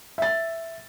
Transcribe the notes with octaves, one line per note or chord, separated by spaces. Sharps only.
E5 A6